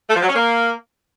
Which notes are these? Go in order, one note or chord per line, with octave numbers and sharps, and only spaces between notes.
A3
F3
F#3
C#4
A#3